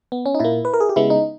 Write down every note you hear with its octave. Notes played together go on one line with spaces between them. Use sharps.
B3
C#4
D#4
A#2 A#3 E4
B4
A#4
G#4
G4
C#3 G#3 B3 E4
D#4